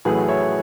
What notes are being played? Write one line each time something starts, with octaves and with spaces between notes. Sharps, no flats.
A1 A2 F#3 A3 G#4 B4
C#5 E5